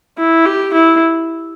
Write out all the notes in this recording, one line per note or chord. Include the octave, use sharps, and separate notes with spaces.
E4
G4
E4